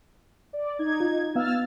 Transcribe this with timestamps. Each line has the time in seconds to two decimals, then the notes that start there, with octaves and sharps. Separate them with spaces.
0.53 D5
0.79 D#4 G#6
1.00 F4
1.36 B3 F5 E6 F6 A6